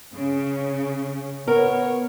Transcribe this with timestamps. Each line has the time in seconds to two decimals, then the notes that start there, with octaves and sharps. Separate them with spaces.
0.13 C#3
1.48 B3 A#4 C#5